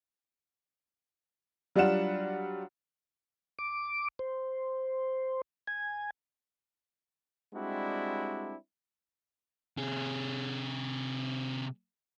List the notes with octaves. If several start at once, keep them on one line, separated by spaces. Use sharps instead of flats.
F#3 G3 D4 F4 F#5 E7
D6
C5
G#5
G3 G#3 C4 D4 E4 F#4
C3 G#4